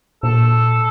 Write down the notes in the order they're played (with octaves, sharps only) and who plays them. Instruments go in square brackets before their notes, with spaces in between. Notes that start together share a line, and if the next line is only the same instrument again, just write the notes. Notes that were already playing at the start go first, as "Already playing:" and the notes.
[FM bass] A#2 [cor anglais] A4